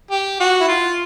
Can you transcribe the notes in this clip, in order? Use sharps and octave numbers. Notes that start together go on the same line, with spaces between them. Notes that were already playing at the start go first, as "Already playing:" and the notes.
G4
F#4
E4
F4